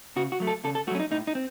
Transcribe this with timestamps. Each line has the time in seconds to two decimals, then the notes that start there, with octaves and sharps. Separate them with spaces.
0.16 C#3 F#4
0.32 F#4
0.40 F#3 A3
0.47 A4
0.64 C#3 A4
0.75 A4
0.87 A3 F#4
0.91 F#3 C#4
1.00 D#4
1.11 A2 D#4
1.27 D#4
1.35 C4